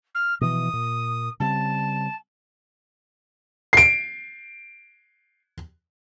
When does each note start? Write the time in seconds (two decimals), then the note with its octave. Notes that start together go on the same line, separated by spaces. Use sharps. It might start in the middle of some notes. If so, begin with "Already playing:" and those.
0.15 F6
0.41 B2 E3 F3 D#6
0.73 A#2
1.40 C#3 G3 C4 A5
3.73 C7 D7